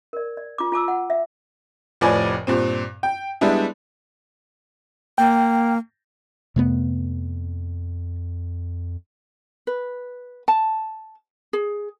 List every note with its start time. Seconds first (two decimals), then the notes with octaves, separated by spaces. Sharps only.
0.13 A#4 D5
0.37 D5
0.58 F4 D6
0.72 F4 A5 D6 E6
0.88 F#5
1.10 E5
2.01 F1 A2 F3 B4 D5 G#5
2.47 G2 A#2 C4
3.03 G5
3.41 G3 G#3 B3 D4 E4
5.18 A#3 G5
6.56 F2 C3 A3 B3
9.67 B4
10.48 A5
11.53 G#4